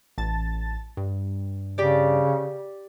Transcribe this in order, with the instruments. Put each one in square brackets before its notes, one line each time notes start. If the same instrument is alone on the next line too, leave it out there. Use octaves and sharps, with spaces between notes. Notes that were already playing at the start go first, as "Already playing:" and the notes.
[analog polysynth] A1 A5 A6
G2
[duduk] C#3 [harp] G4 D5